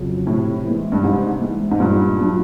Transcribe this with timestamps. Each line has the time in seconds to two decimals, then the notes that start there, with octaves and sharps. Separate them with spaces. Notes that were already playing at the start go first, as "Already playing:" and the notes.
Already playing: F2 C#3 F#3
0.26 A2 C3
0.65 E3 G#3
0.92 G2
1.03 G#2 C3
1.42 E3 G#3
1.71 G#2
1.80 G2 A#2
2.19 F#3 A3 D4 F4